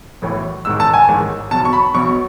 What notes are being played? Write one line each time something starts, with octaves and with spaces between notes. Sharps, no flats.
B1 A2 E3
A1 G#2 D#3 E6
A5
G#5
A1 G#2 D#3
B1 B2 A5
C#6
B5
B1 B2 C#6